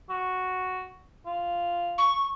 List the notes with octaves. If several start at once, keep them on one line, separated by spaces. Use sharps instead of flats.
F#4
F4
C#6